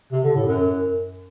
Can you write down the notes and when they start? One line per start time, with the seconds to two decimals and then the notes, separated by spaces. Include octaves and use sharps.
0.12 C3
0.24 D3
0.35 A2
0.47 F#2